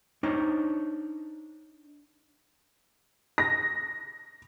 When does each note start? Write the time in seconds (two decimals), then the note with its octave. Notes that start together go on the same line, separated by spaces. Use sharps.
0.23 D4 D#4 C5 C#5
3.38 A#6